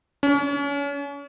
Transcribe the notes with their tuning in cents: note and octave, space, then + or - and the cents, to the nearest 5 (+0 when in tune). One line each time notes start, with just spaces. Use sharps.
C#4 +35